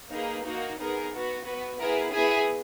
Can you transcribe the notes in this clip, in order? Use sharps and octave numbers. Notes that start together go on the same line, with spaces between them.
A#3 D#4 G#4 B4
A#3 D#4 F#4
B3 D#4 G#4 A#4
B3 F#4
B3 F#4 B4
B3 E4 G#4 A#4
B3 E4 G#4 E5 G#5